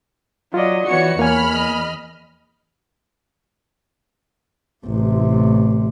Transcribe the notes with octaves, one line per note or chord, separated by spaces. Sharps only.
F#3 F4 D5 D#5
E3 B3 F#4 C#5 C#7
E2 A#3 C#5 G#5 B5 F6
D#5
A1 C3